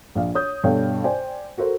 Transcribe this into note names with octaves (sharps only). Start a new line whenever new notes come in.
A#1 F5
C#5 D#6 G6
G2 B2 A4 C#5 F5 G5
C5 D5 G5 G#5
F#4 A4 A#4 C5